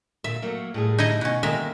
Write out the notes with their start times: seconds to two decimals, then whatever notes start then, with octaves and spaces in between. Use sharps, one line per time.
0.24 A#2 E5
0.42 F#3 A3 A#3
0.74 A2 G3 G#4
0.98 D#4 E4 D#5
1.21 B2 C#4
1.43 D3 D#3 G#3 A#3 A#4 E5